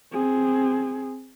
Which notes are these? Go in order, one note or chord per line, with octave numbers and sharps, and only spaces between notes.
C4 G#4